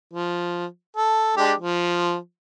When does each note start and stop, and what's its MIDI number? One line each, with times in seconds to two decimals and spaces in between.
0.14 0.66 53
0.97 1.32 69
1.37 1.53 56
1.37 1.53 62
1.37 1.53 67
1.58 2.16 53